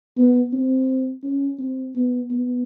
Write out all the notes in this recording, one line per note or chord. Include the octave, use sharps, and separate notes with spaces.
B3
C4
C#4
C4
B3
B3